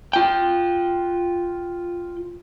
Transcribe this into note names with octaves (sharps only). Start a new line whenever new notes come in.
F4 G5